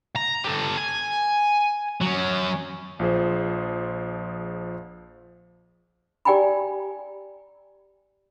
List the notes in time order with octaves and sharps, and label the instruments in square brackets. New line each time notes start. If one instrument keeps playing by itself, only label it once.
[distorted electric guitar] A#5
G4 A4
G#5
F#3 C#4
[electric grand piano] A#1 F3 F4 G#4 C5
[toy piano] G4 D5 G5 G#5 A#5 B5